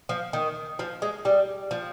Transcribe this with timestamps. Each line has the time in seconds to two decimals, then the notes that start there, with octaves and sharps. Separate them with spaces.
0.09 F3
0.33 D#3
0.79 F3
1.02 G#3
1.25 G3
1.71 F3